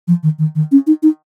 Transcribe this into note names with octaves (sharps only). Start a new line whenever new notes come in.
F3
D#3
D#3
D#3
C#4
D#4
D#4